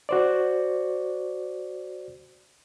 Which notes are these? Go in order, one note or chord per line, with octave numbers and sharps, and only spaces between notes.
F#4 C5 D5